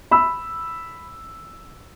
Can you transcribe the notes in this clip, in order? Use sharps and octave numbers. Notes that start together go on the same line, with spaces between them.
B5 E6